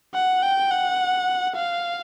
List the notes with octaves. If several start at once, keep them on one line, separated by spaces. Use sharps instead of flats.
F#5
G5
F#5
F5